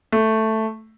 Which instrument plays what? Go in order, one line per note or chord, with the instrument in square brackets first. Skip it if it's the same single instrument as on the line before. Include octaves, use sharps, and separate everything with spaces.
[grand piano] A3